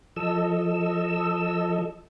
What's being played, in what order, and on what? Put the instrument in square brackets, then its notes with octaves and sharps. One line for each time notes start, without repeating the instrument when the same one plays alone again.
[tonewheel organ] F3 A4 D#5 E6